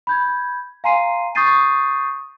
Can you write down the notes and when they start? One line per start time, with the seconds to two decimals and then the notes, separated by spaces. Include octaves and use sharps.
0.07 B5 G6 G#6
0.84 F5 G#5 A#5 C6 C7 D#7
1.35 C#6 D#6 G6 A6 C7 D#7